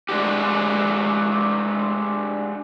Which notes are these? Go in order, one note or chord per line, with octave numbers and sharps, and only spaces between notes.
G#3 D4 F#4 G4